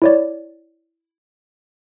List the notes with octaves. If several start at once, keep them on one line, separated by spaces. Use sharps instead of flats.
E4 C#5 D5